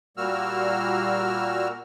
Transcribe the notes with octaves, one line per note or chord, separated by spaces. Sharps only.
A#2 G3 A#3 F#4 E6 F6